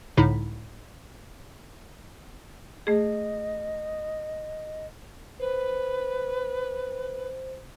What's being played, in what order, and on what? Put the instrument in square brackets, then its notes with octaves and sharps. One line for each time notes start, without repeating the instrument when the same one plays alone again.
[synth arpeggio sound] C#2 A2 D3 D#4 E4 B6
[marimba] A3 G#4 [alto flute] D#5
[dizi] B4 [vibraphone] C5